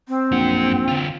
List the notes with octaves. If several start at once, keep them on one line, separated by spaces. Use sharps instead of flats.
C4
A#1 F#2 F#5
D3 F4